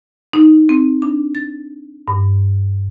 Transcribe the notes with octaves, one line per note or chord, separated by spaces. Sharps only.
D#4
C4
D4
A6
G2